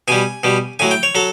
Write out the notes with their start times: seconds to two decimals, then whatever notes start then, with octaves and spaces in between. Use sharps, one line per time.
0.08 B2 G3 G#5
0.44 B2 G3
0.79 A2 F#3 G#5
0.91 G5
1.03 C#5
1.15 F#3 A4